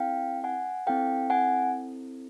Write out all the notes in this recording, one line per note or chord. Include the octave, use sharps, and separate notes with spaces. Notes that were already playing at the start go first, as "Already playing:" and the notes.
Already playing: C4 E4 A4 F5 G5
F#5 G#5
C4 E4 A4 F5 G5
F#5 G#5